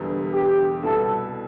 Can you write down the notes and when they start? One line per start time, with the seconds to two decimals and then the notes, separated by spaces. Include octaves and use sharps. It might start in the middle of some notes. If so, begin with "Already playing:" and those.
Already playing: E1 E2 D3 G3 B3
0.32 G4
0.83 C2 B2 B3 E4 A4